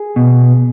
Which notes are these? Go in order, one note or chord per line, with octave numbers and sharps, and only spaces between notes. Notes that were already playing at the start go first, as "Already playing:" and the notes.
Already playing: G#4
B2